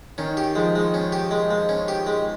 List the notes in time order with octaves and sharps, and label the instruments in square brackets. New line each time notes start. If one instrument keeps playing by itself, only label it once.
[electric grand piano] D#3 [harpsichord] C#4
[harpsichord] G4
[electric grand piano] F3 [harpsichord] G#3
[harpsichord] G#3
C#4
G4
G#3
G#3
C#4
G4
G#3